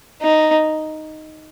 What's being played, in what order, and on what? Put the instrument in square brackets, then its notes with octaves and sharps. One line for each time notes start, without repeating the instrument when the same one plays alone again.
[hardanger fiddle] D#4